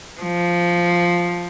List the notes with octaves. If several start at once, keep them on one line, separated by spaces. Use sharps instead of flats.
F3